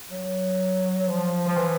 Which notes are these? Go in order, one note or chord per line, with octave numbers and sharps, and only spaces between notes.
F#3
F3
F3
E3